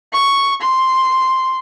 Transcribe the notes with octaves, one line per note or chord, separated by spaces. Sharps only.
C#6
C6